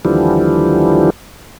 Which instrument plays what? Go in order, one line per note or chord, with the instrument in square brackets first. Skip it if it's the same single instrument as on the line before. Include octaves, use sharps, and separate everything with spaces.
[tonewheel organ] D#2 D3 E3 F3 G3